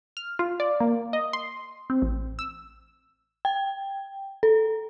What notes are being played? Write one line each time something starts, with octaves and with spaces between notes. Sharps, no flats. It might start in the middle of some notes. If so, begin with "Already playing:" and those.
F6
F4
D5
A#3
D#5
C6
C4
A1
E6
G5
A4